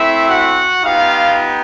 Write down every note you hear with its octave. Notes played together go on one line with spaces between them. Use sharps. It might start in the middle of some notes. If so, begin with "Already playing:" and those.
Already playing: A3 C4 E4 E5
F#4 F#5
B3 D#4 F4 G4 F5